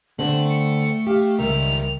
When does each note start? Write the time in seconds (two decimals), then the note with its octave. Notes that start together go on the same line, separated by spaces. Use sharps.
0.19 D3 A3 C4 A5 F#7
0.50 C#7
1.07 G4 F5
1.39 C#2 D#3 G3 A#4 E5 F7